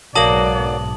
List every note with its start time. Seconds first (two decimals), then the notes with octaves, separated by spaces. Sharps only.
0.15 B1 G#2 F#3 A#3 D5 A5 D#6 F#7